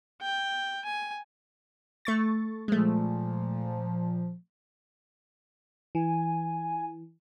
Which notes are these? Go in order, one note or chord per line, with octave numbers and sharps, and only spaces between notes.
G5
G#5
A3 C#6 A6
A#2 F3 G#3 A3
E3 G#5